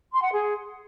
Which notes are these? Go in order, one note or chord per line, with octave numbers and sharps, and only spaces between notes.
C6
F#5
G#4